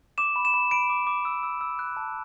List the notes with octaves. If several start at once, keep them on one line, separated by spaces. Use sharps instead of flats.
D6 E7
B5
E7
B5
B5 D7
D6
D6
E6
E6
E6
F#6
A5